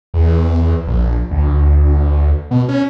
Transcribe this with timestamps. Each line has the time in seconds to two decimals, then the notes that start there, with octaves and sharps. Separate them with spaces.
0.14 E2
0.87 A#1
1.31 D2
2.51 B2
2.69 C#4